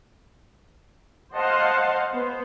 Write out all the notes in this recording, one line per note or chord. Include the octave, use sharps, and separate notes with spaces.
C5 D#5 F5 F#5 A5 C6
B3 C5